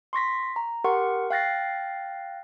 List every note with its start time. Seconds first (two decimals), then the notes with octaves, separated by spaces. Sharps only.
0.13 C6 C#6 A#6 B6
0.56 A#5
0.84 G4 A#4 F#5 C6 C#6
1.30 F5 G5 F#6 A6 A#6 C7